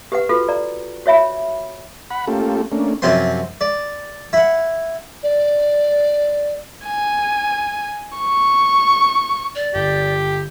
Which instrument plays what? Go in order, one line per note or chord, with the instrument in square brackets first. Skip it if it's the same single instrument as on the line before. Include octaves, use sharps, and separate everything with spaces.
[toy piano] G4 B4 F#5
F4 F#4 A4 B4
D5 A#5
F#4 C#5 E5 B5
[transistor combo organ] F#5 B5
A3 A#3 C#4 F4 G4 A4
A3 A#3 C#4 D4
[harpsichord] F#2 C3 F3 C4 C6
D5
E4 F#5
[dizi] D5
[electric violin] G#5
C#6
[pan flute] D5
[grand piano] G1 [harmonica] G4